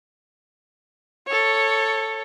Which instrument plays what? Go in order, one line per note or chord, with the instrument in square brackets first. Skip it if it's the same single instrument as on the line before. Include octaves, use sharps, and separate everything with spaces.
[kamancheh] A4 C#5